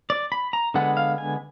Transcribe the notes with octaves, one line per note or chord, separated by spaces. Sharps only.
D5
B5
A#5
D3 G#3 B3 F#5
F5
G#5